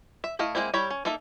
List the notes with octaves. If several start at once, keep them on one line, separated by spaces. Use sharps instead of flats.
E5
A3 E4 D#5 F5
G#3 A#3 C4 E4
G3 E4 C#5 A#5 B5
C#4
A#3 D#4 A4 E5